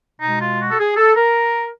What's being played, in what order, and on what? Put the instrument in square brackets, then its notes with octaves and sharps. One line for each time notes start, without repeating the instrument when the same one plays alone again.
[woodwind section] B2 G#3 D#4
F4
F#4
A4
G#4
A4
A#4